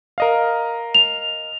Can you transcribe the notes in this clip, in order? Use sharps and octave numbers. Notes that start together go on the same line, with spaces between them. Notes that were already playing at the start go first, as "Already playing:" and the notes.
A#4 D#5 F5
F7